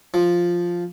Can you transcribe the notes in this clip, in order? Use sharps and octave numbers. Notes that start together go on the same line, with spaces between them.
F3